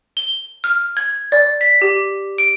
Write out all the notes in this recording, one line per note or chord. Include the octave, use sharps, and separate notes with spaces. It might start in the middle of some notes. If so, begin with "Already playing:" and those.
G7
F6
G#6
D5
B6
G4
D7